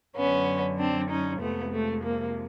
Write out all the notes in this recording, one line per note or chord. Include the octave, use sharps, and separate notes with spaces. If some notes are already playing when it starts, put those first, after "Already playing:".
F#2 D3 F#3 B3 C#4
C4 D4
C#4 D#4
F2 C3 F3 G#3 A3 B3
A3
A#3